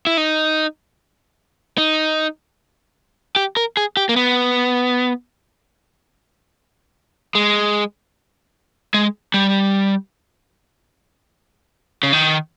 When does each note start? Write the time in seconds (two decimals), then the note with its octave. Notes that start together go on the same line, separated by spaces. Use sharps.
0.07 E4
0.17 D#4
1.78 D#4
3.36 G4
3.57 A#4
3.77 G#4
3.97 G4
4.09 A#3
4.16 B3
7.35 G#3
8.94 G#3
9.34 G3
12.03 C#3
12.13 D#3